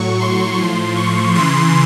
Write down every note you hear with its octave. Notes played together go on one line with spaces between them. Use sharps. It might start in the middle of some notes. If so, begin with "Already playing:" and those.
Already playing: A2 F#3 C#6
C6
A2 F3 C6
C#6
C#3 E3 C6